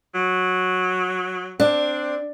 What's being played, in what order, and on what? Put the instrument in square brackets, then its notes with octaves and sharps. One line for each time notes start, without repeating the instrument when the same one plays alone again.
[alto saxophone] F#3
[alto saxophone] C4 [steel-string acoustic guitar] D4